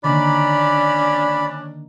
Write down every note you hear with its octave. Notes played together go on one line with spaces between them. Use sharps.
D3 D#3 A#3 C#4 D4 D5 B5